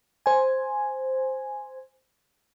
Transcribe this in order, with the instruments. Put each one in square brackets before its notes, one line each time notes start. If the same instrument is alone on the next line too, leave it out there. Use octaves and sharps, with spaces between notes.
[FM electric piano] C5 G#5